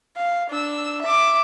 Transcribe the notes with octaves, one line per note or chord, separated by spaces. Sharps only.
F5
D4 E6
E5 D6